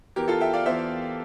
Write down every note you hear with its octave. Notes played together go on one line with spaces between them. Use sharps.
E2 E3 G4 A#4
F4 A4
E5 G5
D5 F5
E2 E3 C5 E5